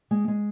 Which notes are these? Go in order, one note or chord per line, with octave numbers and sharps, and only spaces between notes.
G#3
G#3